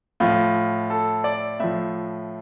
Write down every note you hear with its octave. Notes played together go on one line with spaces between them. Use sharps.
A2 F3 F4
A4
D5
A2 F3 E5